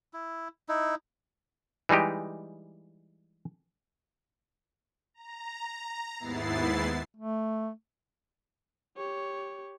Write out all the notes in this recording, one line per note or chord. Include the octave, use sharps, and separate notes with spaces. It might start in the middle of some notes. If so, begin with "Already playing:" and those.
E4
D#4 E4
E3 G3 G#3 D#4 G4
A#5
D#2 G#2 B3 E4 A6 C7
A3
G4 C#5